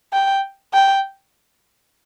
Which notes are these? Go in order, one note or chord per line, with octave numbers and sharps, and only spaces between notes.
G5
G5